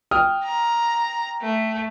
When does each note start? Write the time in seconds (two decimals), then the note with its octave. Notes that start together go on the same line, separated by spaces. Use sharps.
0.11 G5 D#6 F6
0.45 A#5
1.41 A3